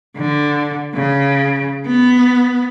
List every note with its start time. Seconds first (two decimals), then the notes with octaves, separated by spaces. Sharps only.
0.17 D3
0.94 C#3
1.86 B3